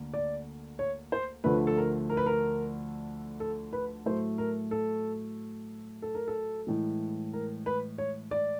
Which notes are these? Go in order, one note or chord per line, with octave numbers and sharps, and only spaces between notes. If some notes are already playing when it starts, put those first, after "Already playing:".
Already playing: D2 D3 A#3
D5
C#5
C5
D2 D3 F3 A3 B4
A4
A#4
A#4
B4
A#4
A4
B4
A2 F#3 A3 C5
A#4
A4
A4
A#4
A4
A2 E3 G#3
A#4
B4
C#5
D5